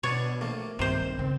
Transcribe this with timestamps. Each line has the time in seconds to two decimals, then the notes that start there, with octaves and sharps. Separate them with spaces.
0.03 B2 B3 D4 D#4 C#5
0.41 A#1 A3 A#3
0.79 B1 G2 C3 D#3 C5
1.19 C#3 C4